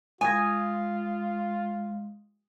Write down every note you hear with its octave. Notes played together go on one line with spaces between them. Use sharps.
G#3 F4 G#5 D#6 G#6 A#6